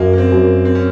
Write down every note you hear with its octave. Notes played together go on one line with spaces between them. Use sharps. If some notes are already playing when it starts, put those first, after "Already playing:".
Already playing: F#2 A#3
A#3
C4
F#2
C4
C#4